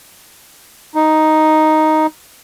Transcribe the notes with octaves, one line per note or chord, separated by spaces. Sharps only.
D#4